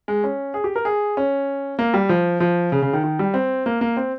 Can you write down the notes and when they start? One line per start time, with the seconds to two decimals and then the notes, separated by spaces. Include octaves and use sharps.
0.08 G#3
0.24 C#4
0.54 G#4
0.64 G4
0.76 A#4
0.85 G#4
1.17 C#4
1.79 A#3
1.94 G3
2.09 F3
2.40 F3
2.72 C#3
2.82 C#3
2.93 D#3
3.04 D#3
3.19 G3
3.34 C4
3.66 A#3
3.81 A#3
3.97 C4